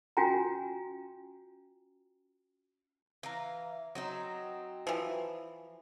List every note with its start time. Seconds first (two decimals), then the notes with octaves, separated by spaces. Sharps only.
0.17 C#4 F4 F#4 G5 G#5 A#5
3.23 E3 F5 A#5
3.95 F#3 C4 D#4
4.87 E3 F3